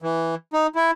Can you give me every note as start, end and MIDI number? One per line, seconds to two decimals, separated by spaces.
0.02 0.35 52
0.53 0.67 63
0.76 0.91 64